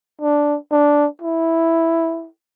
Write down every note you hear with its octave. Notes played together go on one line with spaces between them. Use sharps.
D4
D4
E4